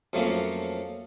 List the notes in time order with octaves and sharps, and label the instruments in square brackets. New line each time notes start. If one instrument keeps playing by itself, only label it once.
[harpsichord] F2 F#3 A3 A#3 C#4